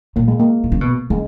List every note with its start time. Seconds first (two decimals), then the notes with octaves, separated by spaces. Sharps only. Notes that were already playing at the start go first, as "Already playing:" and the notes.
0.16 A#2 A#3
0.28 G#3
0.40 A#3
0.64 B2
0.72 C#3
0.81 B2
1.10 C#3 G#3